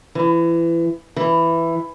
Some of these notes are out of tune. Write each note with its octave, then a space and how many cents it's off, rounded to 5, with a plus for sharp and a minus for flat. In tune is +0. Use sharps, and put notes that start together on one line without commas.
E3 +25
E3 +10